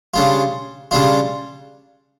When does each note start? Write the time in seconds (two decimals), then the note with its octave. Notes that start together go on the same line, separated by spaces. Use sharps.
0.14 C#3 G3 D4 F4
0.91 C#3 G3 D4 F4